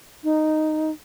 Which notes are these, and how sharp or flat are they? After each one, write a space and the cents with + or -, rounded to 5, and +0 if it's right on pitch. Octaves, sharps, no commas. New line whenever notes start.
D#4 -5